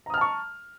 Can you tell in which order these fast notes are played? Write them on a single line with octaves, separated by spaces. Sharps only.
A#5 D#6 F6 A5 C#6